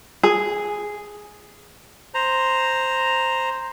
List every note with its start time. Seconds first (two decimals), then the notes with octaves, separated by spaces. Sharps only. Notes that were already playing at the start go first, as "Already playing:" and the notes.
0.23 G#4
2.14 C5 A#5